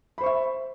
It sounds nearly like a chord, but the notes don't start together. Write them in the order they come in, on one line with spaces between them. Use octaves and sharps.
B5 C5 C#6 E5